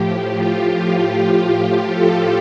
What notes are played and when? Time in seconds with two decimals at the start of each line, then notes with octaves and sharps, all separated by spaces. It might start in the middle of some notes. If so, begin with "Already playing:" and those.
Already playing: A2 F3 G4
0.34 F4
0.72 F4
1.11 G4
1.50 G4
1.88 A4